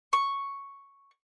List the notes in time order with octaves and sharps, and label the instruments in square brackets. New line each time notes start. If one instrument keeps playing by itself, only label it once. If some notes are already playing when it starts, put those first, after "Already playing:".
[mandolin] C#6